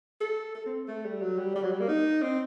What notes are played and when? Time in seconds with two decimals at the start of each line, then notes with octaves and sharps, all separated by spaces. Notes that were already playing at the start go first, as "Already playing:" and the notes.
0.21 A4
0.55 A4
0.66 C4
0.88 A3
1.05 G3
1.22 F#3
1.39 G3
1.56 G3
1.64 F#3
1.71 G3
1.80 A#3
1.88 D#4
2.22 C4